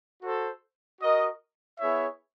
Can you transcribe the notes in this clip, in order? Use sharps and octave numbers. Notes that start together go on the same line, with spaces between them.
F#4 A4 C5
F#4 A#4 D#5
B3 E4 G#4 C#5 E5